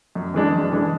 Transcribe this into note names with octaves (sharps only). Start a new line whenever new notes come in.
F#2
E3 G#3 D4
F#2
E3 G#3 D4